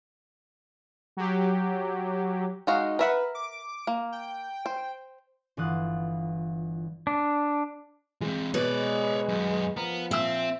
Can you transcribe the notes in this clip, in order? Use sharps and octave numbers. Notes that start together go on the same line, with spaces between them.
F#3 G4
G#3 D#4 F#4 F5
A#4 B4 E5 F#5
D6
A#3
G5
C5
G1 E3 F4 D#6 F#6
D4
E3 G#3 C4
B2 G#3 B4 C#5 D5
F#2 B3
F3 B3 A#4
A#2 C4 E5 E6